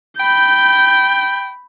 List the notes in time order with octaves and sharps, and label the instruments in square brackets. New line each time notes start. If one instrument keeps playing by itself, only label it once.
[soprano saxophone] G5 [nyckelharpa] B5 [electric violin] G6